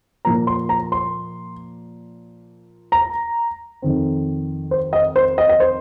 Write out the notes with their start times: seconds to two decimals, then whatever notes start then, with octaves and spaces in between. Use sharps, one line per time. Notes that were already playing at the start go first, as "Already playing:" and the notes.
0.25 A#2 F3 A#3 A#5
0.47 C6
0.69 A#5
0.92 C6
2.92 A#5
3.82 F2 D#3 C4
4.71 C5
4.93 D#5
5.16 C5
5.38 D#5
5.49 D#5
5.60 C5